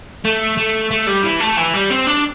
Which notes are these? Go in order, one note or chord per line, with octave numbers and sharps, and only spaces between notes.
A3
A3
A3
G3
E3
A3
E3
G3
C4
D4